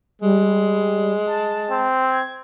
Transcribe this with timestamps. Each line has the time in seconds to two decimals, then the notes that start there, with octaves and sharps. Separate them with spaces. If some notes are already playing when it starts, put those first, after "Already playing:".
0.21 G3 G#3
1.27 A5
1.71 C4
2.08 G#6